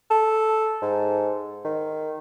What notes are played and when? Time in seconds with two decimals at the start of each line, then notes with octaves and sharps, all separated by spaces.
0.11 A4
0.82 G#2
1.65 D#3